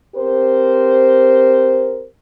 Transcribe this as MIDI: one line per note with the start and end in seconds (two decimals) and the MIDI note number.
0.15 2.05 60
0.15 2.05 67
0.15 2.05 70
0.15 2.05 72